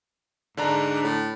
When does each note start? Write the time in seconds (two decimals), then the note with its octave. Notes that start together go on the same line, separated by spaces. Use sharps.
0.57 G#2 D3 D4 A#5
1.03 A2